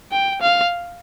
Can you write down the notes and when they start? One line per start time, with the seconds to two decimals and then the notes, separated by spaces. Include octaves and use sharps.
0.12 G5
0.42 F5